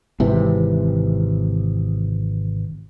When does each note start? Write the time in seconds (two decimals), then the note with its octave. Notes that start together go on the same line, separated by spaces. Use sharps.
0.20 G#1 C3 E3